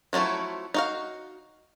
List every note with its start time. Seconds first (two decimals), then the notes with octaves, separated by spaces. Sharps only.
0.13 F3 F#3 A3 C#4 E4
0.74 D#4 F#4 F5